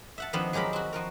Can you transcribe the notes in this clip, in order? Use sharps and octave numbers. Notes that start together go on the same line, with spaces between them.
E5 F#5 A5
D#3 F3 B3 C4 D4
F#3 G#3 G4 A#4 B5
C4 F#4
F3 F#4 A#4